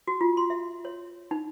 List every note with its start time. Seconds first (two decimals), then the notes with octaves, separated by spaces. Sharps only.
0.07 F#4
0.21 F4
0.37 C6
0.50 E5
0.85 C#5
1.31 D#4